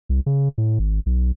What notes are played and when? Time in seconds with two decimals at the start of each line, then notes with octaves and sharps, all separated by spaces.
0.09 C2
0.26 C#3
0.58 A2
0.79 G#1
1.06 B1